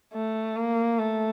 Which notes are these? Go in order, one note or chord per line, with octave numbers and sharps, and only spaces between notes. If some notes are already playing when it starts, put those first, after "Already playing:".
A3
A#3
A3